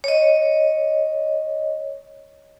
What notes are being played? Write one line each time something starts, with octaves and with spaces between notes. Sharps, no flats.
C#5 D#5